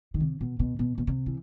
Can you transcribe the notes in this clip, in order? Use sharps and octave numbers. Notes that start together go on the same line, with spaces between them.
D#3
C3
B2
B2
B2
B2
C3
E3